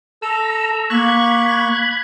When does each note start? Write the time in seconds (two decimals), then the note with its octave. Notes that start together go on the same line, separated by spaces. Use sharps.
0.22 A4 A#5 E6
0.90 A#3 B5 C#6 F#6 G#6